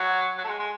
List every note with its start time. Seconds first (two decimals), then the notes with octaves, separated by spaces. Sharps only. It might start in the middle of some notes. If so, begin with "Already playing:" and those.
Already playing: F#3
0.38 F#3
0.44 A3
0.48 G#3
0.59 G#3